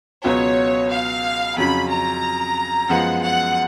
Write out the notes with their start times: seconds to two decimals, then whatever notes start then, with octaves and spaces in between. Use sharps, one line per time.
0.24 C#2 B2 F#3 B3 F4 C#5
0.90 F5
1.57 F2 C#3 F#3 C#4 F4 B5
1.90 A#5
2.89 F#2 F3 G#3 B3 F#5
3.22 F#5